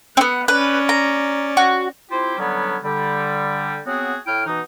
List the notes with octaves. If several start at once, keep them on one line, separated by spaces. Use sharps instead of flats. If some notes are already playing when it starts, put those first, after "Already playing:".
B3 C4 F#5
C#4 B4 D5
A#5
F#4
C4 E4 F4 G4 C5
D3 F#3 G3 B3 C#4
D3 G3
F#3 B3 C4 F#4 G#4
A2 E4 G5 F6
B2 E3 D#4